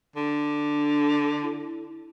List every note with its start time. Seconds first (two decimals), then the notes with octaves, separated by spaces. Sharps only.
0.16 D3 D4
1.42 E4